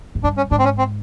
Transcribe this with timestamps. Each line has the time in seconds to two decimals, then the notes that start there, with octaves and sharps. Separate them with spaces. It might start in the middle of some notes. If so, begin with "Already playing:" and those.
0.15 G#2
0.24 G2 D4
0.37 C#4
0.51 G#2 D4
0.59 C4
0.64 C#4
0.78 C4